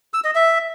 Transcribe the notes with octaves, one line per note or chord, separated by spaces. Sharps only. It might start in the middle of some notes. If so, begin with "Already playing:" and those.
E6
D#5
E5